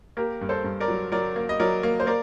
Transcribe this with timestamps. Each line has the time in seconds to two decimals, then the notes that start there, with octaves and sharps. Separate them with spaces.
0.17 A#3 G4 A#4
0.41 G2
0.49 A4 C5
0.64 G2
0.80 A#4 D5
0.88 F#3
1.12 F#3 A#4 D5
1.36 A#3
1.49 D#5
1.60 F#3 A#4 D5
1.83 A#3
2.00 C5
2.07 A#3 A#4 D5